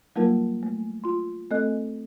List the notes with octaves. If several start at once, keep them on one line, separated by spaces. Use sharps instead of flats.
F#3 G3 A#3 D#4 F4 A#4
A3
F4 C6
A3 C4 A4 D#5 F#6